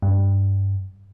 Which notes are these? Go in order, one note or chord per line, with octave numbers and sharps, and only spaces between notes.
G2